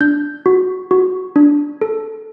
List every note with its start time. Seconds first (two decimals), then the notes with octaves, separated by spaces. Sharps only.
0.01 D4 G6
0.46 F#4
0.91 F#4
1.36 D4
1.81 A4